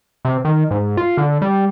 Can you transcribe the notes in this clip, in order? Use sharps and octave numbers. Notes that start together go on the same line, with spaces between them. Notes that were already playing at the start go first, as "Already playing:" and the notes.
C3
D#3
G#2
F4
D3
G3